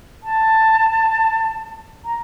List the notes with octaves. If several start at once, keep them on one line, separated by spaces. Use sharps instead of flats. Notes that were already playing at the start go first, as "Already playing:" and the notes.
A5
A#5